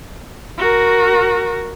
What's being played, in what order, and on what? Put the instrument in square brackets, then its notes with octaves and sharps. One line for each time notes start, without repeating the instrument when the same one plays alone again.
[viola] F#4 A#4